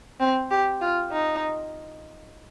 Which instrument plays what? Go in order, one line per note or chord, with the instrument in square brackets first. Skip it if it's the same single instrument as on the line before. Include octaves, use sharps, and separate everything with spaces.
[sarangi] C4
G4
F4
D#4